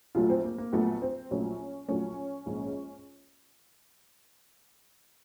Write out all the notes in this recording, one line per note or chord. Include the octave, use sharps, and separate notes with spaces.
A#1 A#2 F#3 A3 F4
C4
A#3
A#3
A#1 A#2 F#3 A3 B3
C4
A#1 A#2 F#3 A3 C#4
A#1 A#2 F#3 A3 C#4
A#1 G#2 F3